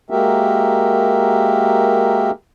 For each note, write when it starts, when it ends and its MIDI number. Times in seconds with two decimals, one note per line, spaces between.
0.10 2.31 56
0.10 2.31 58
0.10 2.31 66
0.10 2.31 67
0.10 2.31 70
0.10 2.31 76